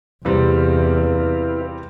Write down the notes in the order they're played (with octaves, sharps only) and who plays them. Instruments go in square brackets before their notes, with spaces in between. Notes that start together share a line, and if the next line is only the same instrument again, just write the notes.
[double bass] E2 [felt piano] C3 G3 C4 [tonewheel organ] E4 B4 F5